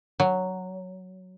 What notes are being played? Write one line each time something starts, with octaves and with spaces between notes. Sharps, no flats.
F#3